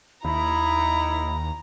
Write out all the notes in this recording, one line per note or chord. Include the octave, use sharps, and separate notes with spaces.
D#2 D#4 E4 A#5 B5